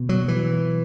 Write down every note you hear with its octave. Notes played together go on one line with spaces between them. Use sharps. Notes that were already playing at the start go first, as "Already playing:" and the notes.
Already playing: B2
F#3
E3